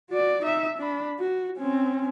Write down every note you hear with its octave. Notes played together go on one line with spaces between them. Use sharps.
F#4 D5
D#4 E5
D4 B5
F#4
C4 C#4